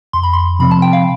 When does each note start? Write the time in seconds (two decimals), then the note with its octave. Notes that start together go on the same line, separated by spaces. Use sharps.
0.13 F2 C6
0.23 B5
0.33 C6
0.59 C3 F3 C4 B5
0.71 A5
0.82 G5
0.93 F5